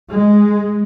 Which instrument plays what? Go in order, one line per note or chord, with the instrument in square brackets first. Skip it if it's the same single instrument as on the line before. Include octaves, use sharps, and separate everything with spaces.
[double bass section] G#3